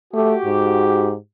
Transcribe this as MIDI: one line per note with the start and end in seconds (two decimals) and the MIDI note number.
0.14 0.34 57
0.14 1.13 66
0.14 1.13 67
0.45 1.15 44